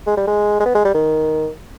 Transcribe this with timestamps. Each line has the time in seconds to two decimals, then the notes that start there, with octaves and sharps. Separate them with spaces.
0.07 G#3
0.17 G3
0.27 G#3
0.60 G#3
0.66 B3
0.75 G#3
0.85 G3
0.95 D#3